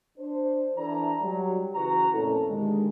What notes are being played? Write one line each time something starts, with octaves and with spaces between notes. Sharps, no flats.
D4 C5
E3 D4 E4 A4 D5 A#5
F#3 G3
C#3 E3 F#4 B4 A#5
F2 A#2 A3 C#4 E4 A4
G2 A#2 D3 D#3 G#3